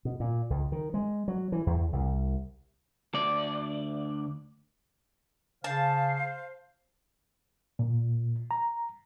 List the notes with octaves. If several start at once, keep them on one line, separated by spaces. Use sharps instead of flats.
B2
A#2
C#2
D#3
G#3
F#3
E3
E2
C2
D2 D5
C#3 C5 F5 A5
A#2
A#5